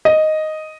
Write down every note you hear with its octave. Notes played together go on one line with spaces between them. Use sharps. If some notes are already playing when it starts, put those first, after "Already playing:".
D#5